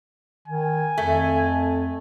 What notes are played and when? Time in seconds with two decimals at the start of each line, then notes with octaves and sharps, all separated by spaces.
0.48 D#3 G#5
0.98 F2 A3